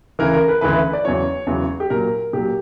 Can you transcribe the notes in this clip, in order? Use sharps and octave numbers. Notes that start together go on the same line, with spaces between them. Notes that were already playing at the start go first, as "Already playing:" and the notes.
D2 C#3 E3 A#4
A#4
B4
D2 C#3 E3 B4
B4
D5
E2 C#3 F#3 C#5
E2 C#3 F#3
G4
A#2 F#3 A#4
A#2 F#3 G4